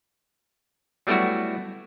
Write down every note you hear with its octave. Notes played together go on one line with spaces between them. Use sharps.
F#3 G3 A3 B3 E4 F#4